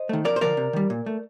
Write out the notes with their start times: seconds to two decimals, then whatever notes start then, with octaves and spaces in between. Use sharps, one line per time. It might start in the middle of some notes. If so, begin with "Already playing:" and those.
Already playing: C5 D#5
0.09 D#3 A3
0.25 F2 A#4 D5
0.36 C5
0.41 D3 F3 A#4 D5
0.57 C3
0.73 D#3 G3
0.90 A#2
1.06 A3